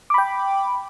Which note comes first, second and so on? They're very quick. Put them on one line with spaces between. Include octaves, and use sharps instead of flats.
D6 B5 G5